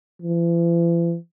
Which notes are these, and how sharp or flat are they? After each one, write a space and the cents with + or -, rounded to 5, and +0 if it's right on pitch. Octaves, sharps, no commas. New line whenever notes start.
E3 +45